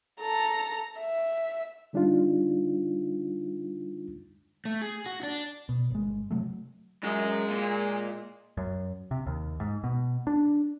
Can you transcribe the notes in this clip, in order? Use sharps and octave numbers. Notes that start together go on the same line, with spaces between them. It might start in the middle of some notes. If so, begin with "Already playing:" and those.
A4 A#5
E5
D3 G3 D4 D#4 F4
A3
G#4
F#4
D4
B2
G1 G#3
C3 F#3 A3
F#2 G#3
A#2
F#2
C3
D#2
G#2
B2
D4